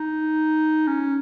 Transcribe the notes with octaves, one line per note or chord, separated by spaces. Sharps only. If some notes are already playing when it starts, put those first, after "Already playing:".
Already playing: D#4
C#4